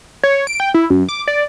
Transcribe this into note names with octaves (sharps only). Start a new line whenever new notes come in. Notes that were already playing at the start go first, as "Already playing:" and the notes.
C#5
D7
G5
E4
F#2
D6
D5